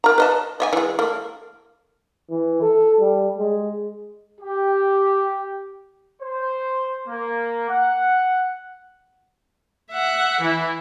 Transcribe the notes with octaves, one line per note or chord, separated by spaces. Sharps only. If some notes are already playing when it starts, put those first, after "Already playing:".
A#4 A#5
B4 D#5 A5
D#5 E5 G#5
E3 G#3
A3 A#3
E3
A4
G3
G#3
G4
C5
A#3
F#5
E5 F#5
E3 E4